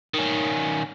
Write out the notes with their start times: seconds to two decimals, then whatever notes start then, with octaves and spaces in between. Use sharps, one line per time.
0.14 D#3 C#4